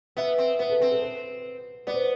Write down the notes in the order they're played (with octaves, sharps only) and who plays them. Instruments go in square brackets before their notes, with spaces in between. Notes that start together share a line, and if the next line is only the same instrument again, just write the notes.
[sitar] B3 [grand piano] E5
[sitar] C4
[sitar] B3 [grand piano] B4
[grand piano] A4
[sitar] C4 [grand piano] B4
[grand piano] A4
B4
[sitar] B3 [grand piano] D5
[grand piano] C5